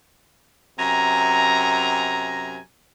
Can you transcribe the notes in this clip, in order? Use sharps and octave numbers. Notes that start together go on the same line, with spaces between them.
F#2 C3 G#5 A#5